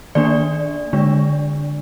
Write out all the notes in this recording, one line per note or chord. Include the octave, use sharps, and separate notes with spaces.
D#3 A#3 D4 D5
D3 G#3 D4